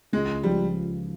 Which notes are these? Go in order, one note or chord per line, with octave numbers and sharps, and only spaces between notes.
C#2 G#3
F3 G3